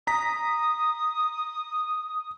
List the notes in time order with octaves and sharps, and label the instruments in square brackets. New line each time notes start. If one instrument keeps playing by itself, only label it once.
[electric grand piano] A#5 B6 [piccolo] D#6